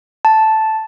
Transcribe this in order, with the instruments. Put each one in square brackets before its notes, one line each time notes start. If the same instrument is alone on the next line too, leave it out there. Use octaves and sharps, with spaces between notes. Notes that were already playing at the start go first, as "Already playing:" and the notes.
[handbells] A5